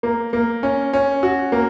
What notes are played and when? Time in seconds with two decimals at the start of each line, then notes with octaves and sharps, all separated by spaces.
0.03 A#3
0.33 A#3
0.63 C#4
0.93 C#4
1.23 F#4
1.52 A#3